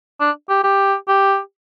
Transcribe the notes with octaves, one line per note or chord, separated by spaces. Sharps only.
D4
G4
G4
G4